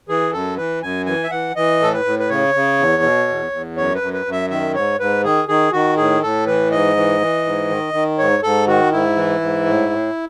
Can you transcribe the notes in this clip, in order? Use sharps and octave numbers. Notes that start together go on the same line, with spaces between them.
E3 G#4
F#2 A4
E3 B4
F#2 G#5
E3 G#5
E5
E3 F#5
E3 D#5
A2 A4
B4
A2
B4
C#3 C#5
C#3
E2
B2
E2
E2
F#2 C#5
B4
F#2
B4
F#2
E5
D#3 E5
G#2 C#5
G#2 B4
D#3 G#4
D#3 G#4
D#3 F#4
A2 G#4
A2 A4
E3 B4
G#2 D#5
E3
E3
G#2
D#3
D#3
G#2 C#5
G#2 A4
D#3 F#4
G#2 E4
E3
G#2
A2
A2